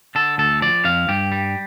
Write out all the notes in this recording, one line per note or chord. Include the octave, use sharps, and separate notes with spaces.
D3 A4
D2 A4
F3 D5
F2 F5
G2 G4
G3